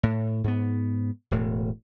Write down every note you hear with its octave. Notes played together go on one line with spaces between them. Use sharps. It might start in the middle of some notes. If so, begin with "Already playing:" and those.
A2
G#2 B3
E1 A2